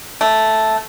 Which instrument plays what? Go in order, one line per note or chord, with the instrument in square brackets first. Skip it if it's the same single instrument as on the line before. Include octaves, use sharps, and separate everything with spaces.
[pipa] A3